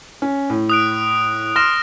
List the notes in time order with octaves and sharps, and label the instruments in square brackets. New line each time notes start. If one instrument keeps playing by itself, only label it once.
[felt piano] C#4
A2
[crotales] D#6 F#6 D7
[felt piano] C6 [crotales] F6 A#6 E7